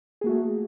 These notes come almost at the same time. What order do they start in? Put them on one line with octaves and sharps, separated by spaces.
G#4 A#3 F#4 A3